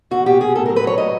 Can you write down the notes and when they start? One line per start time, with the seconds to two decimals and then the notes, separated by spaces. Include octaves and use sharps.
0.11 E2 F#4
0.26 B2 G4
0.40 B2 G#4
0.55 A2 A4
0.66 F#3 A#4
0.76 B4
0.84 F#3 C#5
0.98 A2 D#5